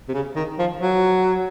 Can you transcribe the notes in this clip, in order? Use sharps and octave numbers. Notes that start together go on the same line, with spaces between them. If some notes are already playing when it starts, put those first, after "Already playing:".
C3
C#3
D#3
F3
F#3